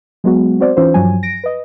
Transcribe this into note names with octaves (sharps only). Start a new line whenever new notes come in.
F#3 G#3 B3 F#4
C4 F#4 C5 D5
E3 C#4 D#4 F4 C5
G2 F3 F#3 G#5
A#6 D7
B4 D#5